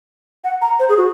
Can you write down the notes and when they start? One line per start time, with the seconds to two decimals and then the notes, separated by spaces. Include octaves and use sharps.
0.44 F#5
0.62 A#5
0.79 C5
0.89 G#4
0.98 F#4